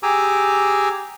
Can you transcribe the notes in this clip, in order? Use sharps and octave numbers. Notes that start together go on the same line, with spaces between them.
G4 G#4 G#5 A#5 D6 E6